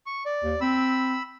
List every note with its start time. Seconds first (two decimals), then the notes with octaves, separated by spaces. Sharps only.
0.06 C#6
0.26 D5
0.44 D#2
0.61 C4 B5 E6